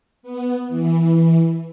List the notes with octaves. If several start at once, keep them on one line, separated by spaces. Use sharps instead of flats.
B3
E3